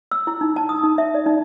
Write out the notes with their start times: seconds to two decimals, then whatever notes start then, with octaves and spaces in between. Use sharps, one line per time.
0.11 E6
0.27 E4
0.41 D#4
0.56 A5
0.69 D#6
0.83 D#4
0.98 E5
1.15 D5
1.26 D#4